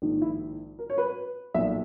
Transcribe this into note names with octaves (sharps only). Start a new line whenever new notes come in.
A#1 G#2 D#3
E4
A#4
C#5
B4
B1 A#2 E5